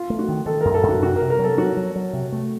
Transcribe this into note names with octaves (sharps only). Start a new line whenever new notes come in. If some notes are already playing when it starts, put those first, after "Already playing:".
Already playing: F4
A3
F#4
D#3
D#3 A4
F#2 A#4
A4
F#2
F#4
C3 F#4
A#4
C3
A#4
F#3 A4
F#3 F#4
F#3
F#3
C3
A3